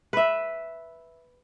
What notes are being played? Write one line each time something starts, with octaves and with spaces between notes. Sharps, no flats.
B4 E5